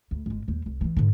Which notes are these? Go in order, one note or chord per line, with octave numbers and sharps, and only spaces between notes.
D2
G1 G#3
D#2 G3
C2
E3 F3
G#2 D3